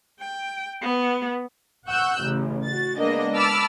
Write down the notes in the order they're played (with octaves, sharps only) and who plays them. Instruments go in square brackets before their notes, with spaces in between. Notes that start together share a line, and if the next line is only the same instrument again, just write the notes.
[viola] G5
B3
[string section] F#5 C#6 E6 F#6 G6
A1 C#3
F#4 A6
G#3 A#3 B3 D4 D#5
A5 B5 D6 E6 F6 A6